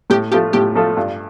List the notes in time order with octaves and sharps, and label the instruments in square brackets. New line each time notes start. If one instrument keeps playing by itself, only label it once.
[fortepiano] A2 [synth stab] G4
[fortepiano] F3 A3 F4 A4 [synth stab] G4
[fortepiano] A2 [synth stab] G4
[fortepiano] F3 A3 F4 A4
G2